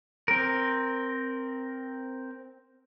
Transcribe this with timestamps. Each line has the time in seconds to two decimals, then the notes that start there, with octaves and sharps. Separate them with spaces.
0.28 C4 A#4